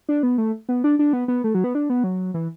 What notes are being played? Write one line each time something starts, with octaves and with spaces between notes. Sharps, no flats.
D4
B3
A3
B3
D4
D4
B3
B3
A3
F#3
B3
D4
B3
F#3
E3